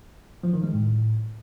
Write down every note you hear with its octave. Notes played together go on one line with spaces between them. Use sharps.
F3
D#3
G#3
A2